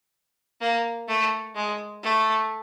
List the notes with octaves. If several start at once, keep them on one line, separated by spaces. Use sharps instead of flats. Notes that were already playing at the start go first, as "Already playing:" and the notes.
A#3
A3
G#3
A3